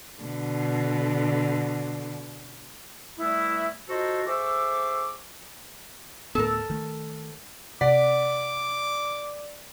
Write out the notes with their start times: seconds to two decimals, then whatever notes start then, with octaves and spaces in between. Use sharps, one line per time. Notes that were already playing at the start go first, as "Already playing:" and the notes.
0.20 B2 D3
3.19 E3 G3 A3 B3 E4
3.89 D#4 F4 F#4 A4 A#4 C5
4.27 G#4 A4 C5 E5 C#6 D6
6.35 D2 A2 B3 A4 A#4
6.70 D#3 A3
7.81 C3 D5 F#5 D6 B6